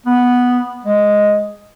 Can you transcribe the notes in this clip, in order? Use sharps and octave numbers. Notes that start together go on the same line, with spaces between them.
B3
G#3